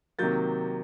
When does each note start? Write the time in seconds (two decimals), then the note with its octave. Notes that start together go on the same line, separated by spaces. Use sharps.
0.19 C3 D#3 F#3 A#3 G6 A6